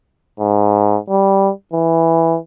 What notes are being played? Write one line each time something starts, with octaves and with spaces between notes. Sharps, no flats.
G#2
G3
E3